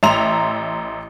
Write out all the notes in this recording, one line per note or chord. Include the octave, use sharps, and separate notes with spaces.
A1 E5 A#5 C6 F7